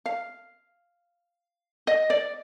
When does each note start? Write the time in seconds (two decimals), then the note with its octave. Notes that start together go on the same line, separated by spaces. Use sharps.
0.06 F5
1.87 D#5
2.10 D5